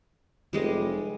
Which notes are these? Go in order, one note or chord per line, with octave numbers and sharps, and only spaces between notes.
F1 G3 G#3 D#5